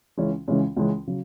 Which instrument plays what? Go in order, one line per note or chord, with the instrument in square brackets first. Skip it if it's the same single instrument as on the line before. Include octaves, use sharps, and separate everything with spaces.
[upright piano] C#2 C#3 E3 G#3 C#4
C#2 C#3 E3 G#3 C#4
C#2 C#3 E3 G#3 C#4
C#3 F#3